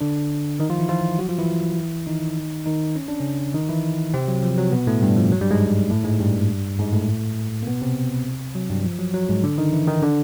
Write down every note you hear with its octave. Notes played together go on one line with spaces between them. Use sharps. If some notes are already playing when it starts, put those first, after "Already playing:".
D3 D4
D#3 D#4
F3 F4
E3 E4
F3 F4
F#3 F#4
F3 F4
E3 E4
D#3 D#4
D#3 D#4
C#4
D4
C#3 C#4
D#3 D#4
E3 E4
C3 C4
F#3
F3
F#3
B2 B3
A2 A3
G2 G3
F3
F#3
G2 G3
G#2 G#3
A2 A3
G#2 G#3
G2 G3
G#2 G#3
A2 A3
A#3
B2 B3
C3 C4
F#3
G2 G3
F3
F#3
F#3
G#2 G#3
D3 D4
D#3 D#4
E3 E4
D#3 D#4
D3 D4